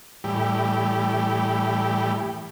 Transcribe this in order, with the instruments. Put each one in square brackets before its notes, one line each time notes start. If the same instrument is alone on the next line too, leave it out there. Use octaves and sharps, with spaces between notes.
[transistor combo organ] A2 E3 G3 G4